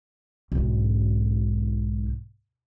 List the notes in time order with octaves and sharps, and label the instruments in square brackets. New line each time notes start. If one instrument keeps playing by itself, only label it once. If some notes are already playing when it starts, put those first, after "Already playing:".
[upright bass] B1 G#2